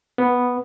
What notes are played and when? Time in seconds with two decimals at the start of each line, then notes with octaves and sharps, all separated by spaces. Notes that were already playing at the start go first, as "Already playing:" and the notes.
0.18 B3